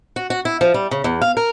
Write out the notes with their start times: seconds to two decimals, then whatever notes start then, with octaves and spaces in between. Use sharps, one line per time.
0.16 F#4
0.30 F#4
0.45 E4
0.61 F3
0.74 G3
0.91 C#3
1.04 E2
1.21 F5
1.37 A#4